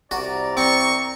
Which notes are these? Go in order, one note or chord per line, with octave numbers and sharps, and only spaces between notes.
C2 F#4 D5 A#5
C4 C#6